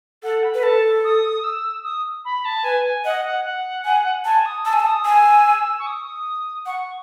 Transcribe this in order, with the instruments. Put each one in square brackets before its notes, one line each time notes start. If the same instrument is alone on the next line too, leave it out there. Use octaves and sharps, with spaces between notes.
[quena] A4 [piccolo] F#5
[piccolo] B5
[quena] B4
[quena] A4 [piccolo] A5
[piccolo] D#6
E6
D#6
B5
A5
[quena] B4 [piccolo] G#5
[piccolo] G#5
[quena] D#5 [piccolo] F#5
[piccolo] F#5
F#5
[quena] G#5
[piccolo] G#5 [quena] A5
[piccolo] D#6
[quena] A5 [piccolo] E6
[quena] G#5
A5
[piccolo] D#6
[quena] G#5 [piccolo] E6
[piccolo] C#6
D#6
[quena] F#5 [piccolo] C#6